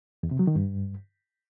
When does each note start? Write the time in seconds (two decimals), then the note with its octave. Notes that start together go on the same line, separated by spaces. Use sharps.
0.23 E2
0.31 C3
0.39 F#3
0.47 D#3
0.55 G2